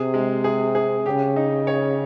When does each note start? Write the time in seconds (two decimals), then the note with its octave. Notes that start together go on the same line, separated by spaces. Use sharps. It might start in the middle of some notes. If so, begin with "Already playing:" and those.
Already playing: C3 G#4
0.14 G#3
0.44 G#4
0.75 G#4
1.06 C#3 G4
1.36 D#4
1.67 C#5